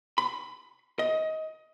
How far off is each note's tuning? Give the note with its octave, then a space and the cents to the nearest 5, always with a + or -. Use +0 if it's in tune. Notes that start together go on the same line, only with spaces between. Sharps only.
B5 +20
D#5 +20